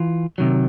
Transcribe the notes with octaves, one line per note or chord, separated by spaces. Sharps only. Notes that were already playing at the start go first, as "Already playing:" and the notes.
Already playing: E3 F4
C3 D#3 F#3